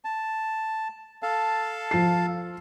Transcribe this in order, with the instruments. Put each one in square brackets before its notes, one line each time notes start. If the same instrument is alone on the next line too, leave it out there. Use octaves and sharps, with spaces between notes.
[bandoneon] A5
A4 F5 A5
[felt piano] F3 C7